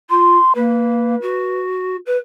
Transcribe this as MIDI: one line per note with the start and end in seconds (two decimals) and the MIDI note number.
0.10 0.37 65
0.10 0.53 84
0.55 1.15 58
0.55 1.60 71
1.22 1.96 66
2.06 2.17 71